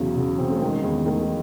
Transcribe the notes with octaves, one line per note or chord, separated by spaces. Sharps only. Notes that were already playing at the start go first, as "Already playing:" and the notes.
Already playing: E2 C#3 F#3
C#3
C#3 C4
A3
D#3 G#3
E2
D#3 A3